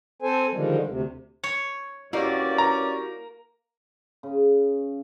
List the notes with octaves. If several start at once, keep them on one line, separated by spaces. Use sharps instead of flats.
C4 A4 C5 G#5
D3 D#3 F3 G3 G#3
D2 C3
C#5
G2 A#3 C#4 E4 F#4 G4 D5
A#5
C#3